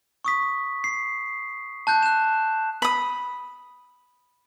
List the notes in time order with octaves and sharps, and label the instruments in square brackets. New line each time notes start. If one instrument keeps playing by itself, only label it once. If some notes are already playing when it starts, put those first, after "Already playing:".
[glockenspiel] C#6 D#6 B6
C7
A5 F#6 G6
F#6 E7
[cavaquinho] B5 D#6